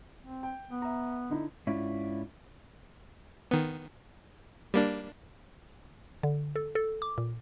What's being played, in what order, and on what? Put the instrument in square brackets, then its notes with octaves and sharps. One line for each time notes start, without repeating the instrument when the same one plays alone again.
[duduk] C4
[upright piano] G5
[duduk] B3
[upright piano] E5 A#5
D3 D#4 E4
[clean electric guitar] G#2 C#4 D4 E4 F4
[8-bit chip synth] D#3 B3
G3 A#3 D4
[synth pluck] D3
A4
A4
D6
A#2